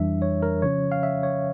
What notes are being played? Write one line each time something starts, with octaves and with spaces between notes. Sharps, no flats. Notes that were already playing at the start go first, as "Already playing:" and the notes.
Already playing: F2 E3 G3 D4 E5
C#5
A#4
C#3 F3 C#4 C#5
F5
E5
C#5